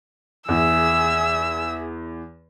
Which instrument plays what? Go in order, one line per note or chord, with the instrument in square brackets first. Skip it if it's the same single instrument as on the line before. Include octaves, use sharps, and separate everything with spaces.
[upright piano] E2 [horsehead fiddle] G#4 E5 [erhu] E6